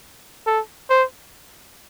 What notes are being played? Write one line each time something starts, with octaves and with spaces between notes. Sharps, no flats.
A4
C5